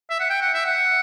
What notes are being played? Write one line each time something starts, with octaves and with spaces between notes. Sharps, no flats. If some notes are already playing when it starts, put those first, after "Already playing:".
E5
F#5
G5
F#5
E5
F#5